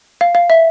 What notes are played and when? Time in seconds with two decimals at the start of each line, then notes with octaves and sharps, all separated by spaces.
0.21 F5
0.35 F5
0.50 E5